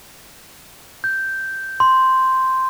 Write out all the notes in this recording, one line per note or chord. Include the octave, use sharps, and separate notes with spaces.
G6
C6